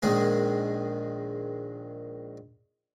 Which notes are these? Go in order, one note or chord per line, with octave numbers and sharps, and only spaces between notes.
A#1 D#3 G#3 G#4